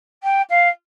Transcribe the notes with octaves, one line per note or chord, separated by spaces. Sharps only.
G5
F5